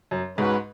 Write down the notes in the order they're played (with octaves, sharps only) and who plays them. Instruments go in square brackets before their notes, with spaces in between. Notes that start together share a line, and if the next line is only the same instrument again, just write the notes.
[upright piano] F#2
[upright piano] G#2 [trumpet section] C#4 F#4 B4